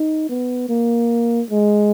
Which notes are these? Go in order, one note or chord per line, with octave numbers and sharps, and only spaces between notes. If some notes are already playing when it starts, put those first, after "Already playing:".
Already playing: D#4
B3
A#3
G#3